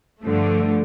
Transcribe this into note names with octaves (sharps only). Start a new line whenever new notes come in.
G2 D3 F3 A3